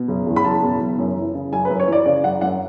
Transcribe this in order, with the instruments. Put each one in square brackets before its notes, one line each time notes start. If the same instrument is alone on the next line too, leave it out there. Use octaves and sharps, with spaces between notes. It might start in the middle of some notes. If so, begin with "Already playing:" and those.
Already playing: [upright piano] B2
F#1
E2
B5
F#1 A5
B2
F#1
F#2
E3
C#3
F#1 G#5
B4
F#2
C#5
E3 D5
C#3 D5
F#1 F#5
F#2 F#5